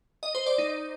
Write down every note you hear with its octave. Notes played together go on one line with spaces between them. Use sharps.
D#5
C5
D5
D#4